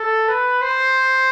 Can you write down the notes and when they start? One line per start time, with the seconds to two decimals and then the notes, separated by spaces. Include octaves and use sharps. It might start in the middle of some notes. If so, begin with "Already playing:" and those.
Already playing: A4
0.28 B4
0.62 C5